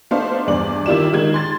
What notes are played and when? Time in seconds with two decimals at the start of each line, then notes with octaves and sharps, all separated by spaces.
0.11 A3 B3 D4 D#4 C5 F5
0.47 E2 G2 D5 F#7
0.86 D#3 E4 F4 G4 D5 E7
1.13 D#3 G#3 G#6
1.34 C6 A6